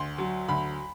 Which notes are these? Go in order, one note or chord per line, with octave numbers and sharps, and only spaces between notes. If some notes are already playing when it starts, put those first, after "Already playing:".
Already playing: D2 C6
F#3
D2 B5